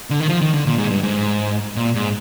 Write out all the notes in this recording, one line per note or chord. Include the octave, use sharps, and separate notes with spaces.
D3
D#3
F3
D#3
D3
A#2
G#2
G2
G#2
A#2
G#2